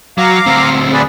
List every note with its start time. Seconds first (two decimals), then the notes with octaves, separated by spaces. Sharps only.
0.18 F#3 F5 A#5 D6
0.46 D2 C4
0.93 G#4 B4 D5